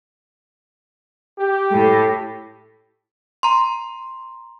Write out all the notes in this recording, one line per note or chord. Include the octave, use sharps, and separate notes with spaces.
G4
A2
A#5 C6